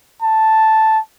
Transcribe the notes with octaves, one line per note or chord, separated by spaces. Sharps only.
A5